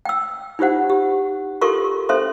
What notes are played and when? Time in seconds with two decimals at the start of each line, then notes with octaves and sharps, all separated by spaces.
0.05 G5 E6
0.59 D#4 F4 G4 C5 F#5
0.90 G4
1.62 F4 G4 A4 A#4 C6 C#6
2.09 C#4 A4 C5 E5 C6